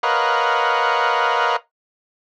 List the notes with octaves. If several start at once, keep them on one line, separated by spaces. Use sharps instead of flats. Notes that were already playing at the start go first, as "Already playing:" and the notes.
A#4 B4 C#5 D#5 F5 F#5